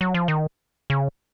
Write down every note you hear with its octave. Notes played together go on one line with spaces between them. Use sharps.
F#3
F3
D#3
C#3